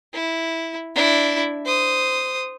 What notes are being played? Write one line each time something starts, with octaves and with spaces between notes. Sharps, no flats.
E4
D4 E4
C5 D#6